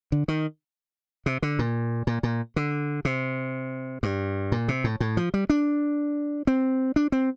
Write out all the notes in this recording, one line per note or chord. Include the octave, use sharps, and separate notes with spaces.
D3
D#3
C3
D3
A#2
A#2
A#2
D3
C3
G2
A#2
C3
A2
A2
F3
G3
D4
C4
D4
C4